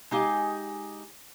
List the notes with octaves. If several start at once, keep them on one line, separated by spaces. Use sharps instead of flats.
G#3 D#4 G4 F5 G#5